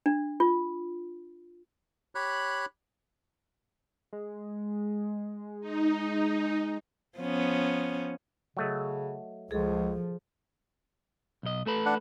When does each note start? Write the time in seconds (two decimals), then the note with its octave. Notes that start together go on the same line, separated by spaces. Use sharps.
0.06 D4
0.40 F4
2.15 G4 C#5 B5 F#6
4.13 G#3
5.61 D#4
7.18 F3 B3 C#4
8.57 C#3 F#3 A3 D#5
9.51 C#2 F3 G#4 A4
11.43 B1 D#5
11.66 A3 A4 B4
11.86 D4 F#5